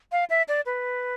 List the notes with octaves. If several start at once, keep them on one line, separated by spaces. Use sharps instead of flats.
F5
E5
D5
B4